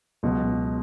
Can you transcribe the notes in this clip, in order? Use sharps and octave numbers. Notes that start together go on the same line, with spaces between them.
C#2 B2 F#3